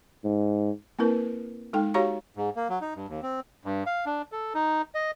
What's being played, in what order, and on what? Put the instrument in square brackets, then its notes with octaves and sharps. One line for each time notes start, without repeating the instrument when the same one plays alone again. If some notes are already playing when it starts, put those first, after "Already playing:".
[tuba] G#2
[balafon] A#3 C4 E4 A#4 B4
G#3 D#4 A4 G5
F#4 G4 C#5 F5 A#5 C#6
[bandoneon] G#2
A#3
F#3
D#4
G2
D#2
C4
G2
F5
D4
A4
D#4
D#5